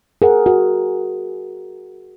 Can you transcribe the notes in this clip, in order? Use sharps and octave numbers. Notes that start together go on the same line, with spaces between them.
G#4 A#4 F#5
F#4